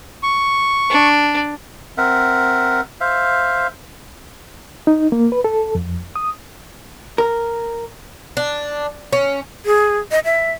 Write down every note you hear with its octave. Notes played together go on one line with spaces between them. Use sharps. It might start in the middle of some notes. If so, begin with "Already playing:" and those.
C#6
D4
C4 A#4 E5 F#5
C5 E5 F5
D#4
A#3
B4
A4
F2
D#6
A#4
D4
C#4
G#4
D#5
E5